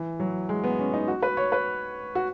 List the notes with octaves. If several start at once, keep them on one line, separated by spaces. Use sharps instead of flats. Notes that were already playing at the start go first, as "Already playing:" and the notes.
Already playing: E3
F#3
G#3
B3
C#4
D#4
F#4
B4
C#5
B4
F#4